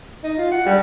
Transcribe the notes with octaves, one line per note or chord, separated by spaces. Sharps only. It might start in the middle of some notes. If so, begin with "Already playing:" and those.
D#4
F4
F#5
G3